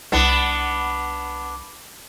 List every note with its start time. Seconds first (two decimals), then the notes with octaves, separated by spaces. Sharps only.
0.12 C2 B3 D4